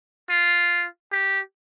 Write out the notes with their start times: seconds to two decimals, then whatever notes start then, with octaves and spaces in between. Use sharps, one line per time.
0.30 F4
1.12 G4